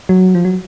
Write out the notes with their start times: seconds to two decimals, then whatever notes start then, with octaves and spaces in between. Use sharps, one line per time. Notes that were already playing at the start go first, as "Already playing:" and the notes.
0.09 F#3
0.35 F3
0.45 F#3